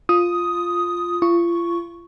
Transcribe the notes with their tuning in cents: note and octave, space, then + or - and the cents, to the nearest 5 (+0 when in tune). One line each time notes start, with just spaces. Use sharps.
F4 +0 D#6 +5
F4 -35 C#6 +0